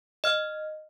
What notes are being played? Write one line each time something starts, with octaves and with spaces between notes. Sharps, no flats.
D#5 F6